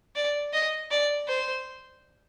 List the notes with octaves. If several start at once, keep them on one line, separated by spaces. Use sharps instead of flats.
D5
D#5
D5
C5